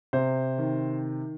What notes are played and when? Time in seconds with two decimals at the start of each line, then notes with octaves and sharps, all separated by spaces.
0.13 C3 C5
0.58 D#3